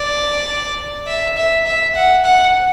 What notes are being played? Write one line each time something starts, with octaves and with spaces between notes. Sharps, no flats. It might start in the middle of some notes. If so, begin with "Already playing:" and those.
Already playing: D5
E5
E5
E5
F#5
F#5